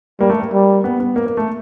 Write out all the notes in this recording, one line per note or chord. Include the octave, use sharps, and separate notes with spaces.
G3 A#3
A3
A#3
G3
B3
B3
A#3
A#3
A3